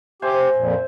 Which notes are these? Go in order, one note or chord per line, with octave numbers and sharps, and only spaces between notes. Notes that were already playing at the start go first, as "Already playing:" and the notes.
G4 C5 E5 G#5
F2 A#2